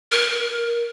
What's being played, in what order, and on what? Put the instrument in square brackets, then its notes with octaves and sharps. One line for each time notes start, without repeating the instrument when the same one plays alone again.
[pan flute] A#4